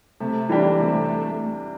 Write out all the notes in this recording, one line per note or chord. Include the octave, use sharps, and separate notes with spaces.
C3 A3
E3 G3 D4 G4
C3 A3